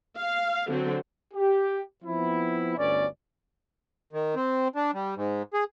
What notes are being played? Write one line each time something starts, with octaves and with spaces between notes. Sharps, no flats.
F5
D3 F#3 C4
G4
F3 B3 C4 E4
G1 D2 B3 C#4 D5
D#3
C4
D4
G3
G#2
G#4